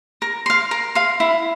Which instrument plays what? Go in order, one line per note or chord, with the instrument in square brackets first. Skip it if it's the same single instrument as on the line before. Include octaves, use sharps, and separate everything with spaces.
[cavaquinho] A#4
F5 C6
A#4
F5 C6
E4